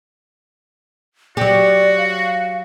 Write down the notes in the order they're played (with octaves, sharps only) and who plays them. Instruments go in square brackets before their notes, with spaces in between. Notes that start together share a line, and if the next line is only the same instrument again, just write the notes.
[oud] F#3 G4 [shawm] F#4 [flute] D5
[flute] F5